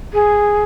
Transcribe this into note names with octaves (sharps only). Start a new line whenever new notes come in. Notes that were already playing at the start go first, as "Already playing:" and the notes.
G#4